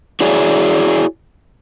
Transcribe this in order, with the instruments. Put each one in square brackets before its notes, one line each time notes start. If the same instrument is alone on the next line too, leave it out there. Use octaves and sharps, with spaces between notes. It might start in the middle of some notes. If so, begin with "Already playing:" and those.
[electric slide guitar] E4 F#4 G#4 C#5 D5